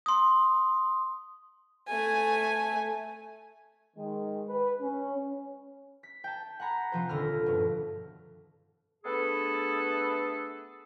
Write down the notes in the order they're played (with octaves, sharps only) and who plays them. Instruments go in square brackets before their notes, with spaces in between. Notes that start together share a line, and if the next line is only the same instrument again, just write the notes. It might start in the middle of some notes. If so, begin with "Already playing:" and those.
[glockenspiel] C6 D#6
[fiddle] A3 G#5
[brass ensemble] D#3 G#3
B4
C#4
[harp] B6
G5 A5
F#5 G#5 A#5 B5
C3 F3 C5
D#1 D3 A4 B5 F6 A#6
G2 B2
[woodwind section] A3 B3 D4 G#4 A4 B4